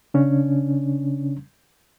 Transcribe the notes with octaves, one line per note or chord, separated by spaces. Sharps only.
C#3 C#4 D4